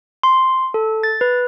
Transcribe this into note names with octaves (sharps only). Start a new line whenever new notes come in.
C6
A4
A6
B4